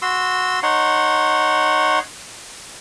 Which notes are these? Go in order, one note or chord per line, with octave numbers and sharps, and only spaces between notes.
F#4 C6 E6
D#4 C#5 F#5 C6